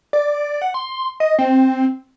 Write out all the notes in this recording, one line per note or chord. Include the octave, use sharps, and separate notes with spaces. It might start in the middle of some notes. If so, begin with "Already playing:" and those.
D5
F#5
C6
D#5
C4